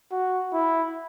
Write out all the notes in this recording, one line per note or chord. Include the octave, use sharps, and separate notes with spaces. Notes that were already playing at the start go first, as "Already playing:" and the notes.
F#4
E4